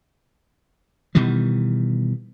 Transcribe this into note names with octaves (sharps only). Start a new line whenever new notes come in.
B2 D#3 E3 G3